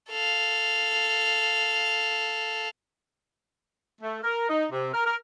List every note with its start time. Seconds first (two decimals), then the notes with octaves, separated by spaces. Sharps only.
0.10 A4 F5
4.02 A3
4.23 A#4
4.49 D#4
4.71 C3
4.93 A#4
5.06 A#4